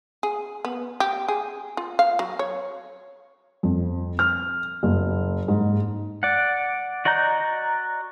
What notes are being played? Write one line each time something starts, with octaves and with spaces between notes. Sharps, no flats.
G#4
B3
G4
G#4
F4
F5
F#3
C#5
F2
F6
F#1
G#2
D5 F#5
F#4 D5 D#5 A#5 G6